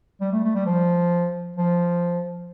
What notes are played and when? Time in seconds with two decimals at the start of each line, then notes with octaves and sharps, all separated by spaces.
0.20 G3
0.32 A3
0.43 A3
0.55 G3
0.66 F3
1.56 F3